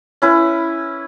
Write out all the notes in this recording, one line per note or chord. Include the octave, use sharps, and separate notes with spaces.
C#4 E4 B4